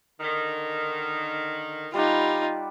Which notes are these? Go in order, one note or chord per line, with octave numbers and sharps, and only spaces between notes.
D3 D#3
G3 D#4 F4 D5 F#5